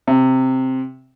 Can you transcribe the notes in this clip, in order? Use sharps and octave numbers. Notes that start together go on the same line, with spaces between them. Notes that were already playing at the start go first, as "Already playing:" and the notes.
C3